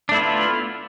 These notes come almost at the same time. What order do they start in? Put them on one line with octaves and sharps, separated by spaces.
D4 A3 E4 B3 F4